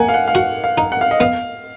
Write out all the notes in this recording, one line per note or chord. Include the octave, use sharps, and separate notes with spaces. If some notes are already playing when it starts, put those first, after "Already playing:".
Already playing: A#3 F#5 G#5
F5
F#5
F5
F#4 F#5
F5
D#4
F#5
F5
D#5
B3 F5